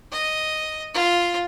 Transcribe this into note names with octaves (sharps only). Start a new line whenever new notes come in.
D#5
F4